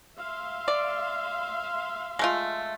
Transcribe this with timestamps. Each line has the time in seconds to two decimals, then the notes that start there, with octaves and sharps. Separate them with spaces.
0.19 E5 F5 C6
0.68 D5
2.19 G#3 A3 F4